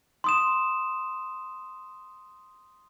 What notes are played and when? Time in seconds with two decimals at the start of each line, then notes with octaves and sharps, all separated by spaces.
0.24 C6 D#6 E7